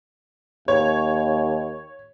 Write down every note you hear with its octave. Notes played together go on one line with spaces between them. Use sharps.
D#2 C#5